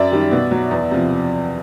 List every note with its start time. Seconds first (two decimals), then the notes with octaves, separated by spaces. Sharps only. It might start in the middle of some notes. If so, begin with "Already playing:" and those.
Already playing: F#2 D5 E5
0.11 D#3 G3
0.31 B2
0.51 F#3
0.71 E2
0.91 C3 F3